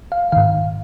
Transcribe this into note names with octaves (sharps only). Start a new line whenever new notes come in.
F5
G#2 D#3 F5